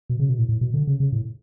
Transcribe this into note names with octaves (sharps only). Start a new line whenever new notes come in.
B2
C#3
B2
A2
A2
B2
D3
C#3
C#3
A2